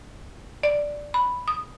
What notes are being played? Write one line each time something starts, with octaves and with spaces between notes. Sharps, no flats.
D5
B5
D#6